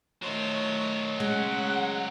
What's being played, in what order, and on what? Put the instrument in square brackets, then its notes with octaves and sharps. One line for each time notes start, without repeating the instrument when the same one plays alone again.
[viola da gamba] D#3 A3 C#5 [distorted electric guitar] F#3 C5
[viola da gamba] C#3 [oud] G#3 [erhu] F#5